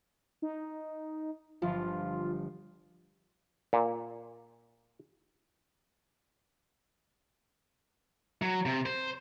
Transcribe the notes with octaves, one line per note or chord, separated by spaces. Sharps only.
D#4
G1 F3 F4
A#2
F#3
C3
C5